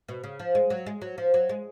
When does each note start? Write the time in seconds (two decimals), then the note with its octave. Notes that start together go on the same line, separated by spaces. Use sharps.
0.09 B2
0.23 C#3
0.39 F3
0.55 G#3
0.70 F#3
0.86 G#3
1.02 F#3
1.18 F3
1.34 F#3
1.49 G#3